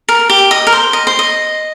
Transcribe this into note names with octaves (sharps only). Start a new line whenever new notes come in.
A#4
G4
D#5
A#4
C5
D#5
C5
D#5